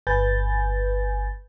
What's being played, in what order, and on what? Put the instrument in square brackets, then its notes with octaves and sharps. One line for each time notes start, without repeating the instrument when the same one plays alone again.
[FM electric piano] G1 B4 G#5 G6 A6